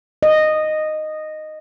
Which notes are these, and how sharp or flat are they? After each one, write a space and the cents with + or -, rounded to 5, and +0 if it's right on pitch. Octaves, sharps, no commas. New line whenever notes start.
D#5 -10